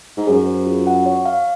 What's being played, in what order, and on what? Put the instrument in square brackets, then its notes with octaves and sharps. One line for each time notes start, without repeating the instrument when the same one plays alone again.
[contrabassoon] G#2
[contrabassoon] F#2 [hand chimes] G#4
[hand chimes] C5
F4
F#5
C#5
F5